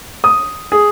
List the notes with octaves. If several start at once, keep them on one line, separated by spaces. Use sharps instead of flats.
D#6
G#4